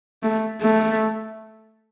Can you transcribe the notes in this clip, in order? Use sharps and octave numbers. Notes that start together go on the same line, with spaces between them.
A3
A3